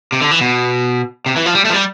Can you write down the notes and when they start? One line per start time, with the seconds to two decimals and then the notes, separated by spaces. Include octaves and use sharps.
0.12 C3
0.21 D3
0.31 E3
0.41 B2
1.26 C3
1.36 E3
1.46 F3
1.55 G3
1.65 A3
1.70 F3
1.74 G3